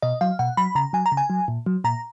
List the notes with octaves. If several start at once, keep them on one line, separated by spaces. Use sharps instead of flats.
B2 D#5
F#3 F5
B2 F#5
F#3 B5
C#3 A#5
F#3 G#5
A#5
C#3
G#5
F#3
A#2
F#3
A#2 A#5